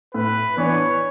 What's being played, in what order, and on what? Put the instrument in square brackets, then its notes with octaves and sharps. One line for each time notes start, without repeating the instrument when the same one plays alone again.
[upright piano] A2 [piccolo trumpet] B4
[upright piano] E3 B3 D4 [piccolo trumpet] C#5